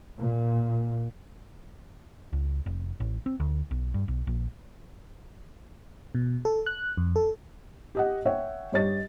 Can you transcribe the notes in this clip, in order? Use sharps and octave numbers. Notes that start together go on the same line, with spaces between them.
A#2
C#2
F1
A1
C4
D2
B1
G2
B1
A#1
B2
A4
F#6
F2
A4
G4 D#5 F#5
C#5 E5 F#5 G5
G2 G4 C#5 D#5 A6